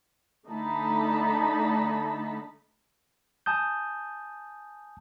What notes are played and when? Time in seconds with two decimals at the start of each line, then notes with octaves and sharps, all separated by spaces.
0.47 D3 A3 D#4 A5 B5
3.46 G#5 A5 D#6 G6